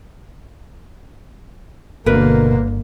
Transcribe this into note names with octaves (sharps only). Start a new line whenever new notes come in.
G1 B2 D3 A#3 A#4 B4